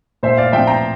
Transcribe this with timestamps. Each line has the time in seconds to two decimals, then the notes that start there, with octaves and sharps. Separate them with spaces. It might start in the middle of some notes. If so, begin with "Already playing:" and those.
0.23 A#2 C5 E5
0.37 D5 F5
0.52 F3 C4 E5 G5
0.67 G5 A#5